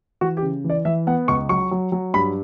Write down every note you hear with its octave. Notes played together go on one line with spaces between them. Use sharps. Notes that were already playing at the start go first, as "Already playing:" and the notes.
E3 F#4
G4
C#3
E3
D5
E3 E5
B3 F#5
C#2 C#6
F#3 C#6
F#3
F#3
G2 B5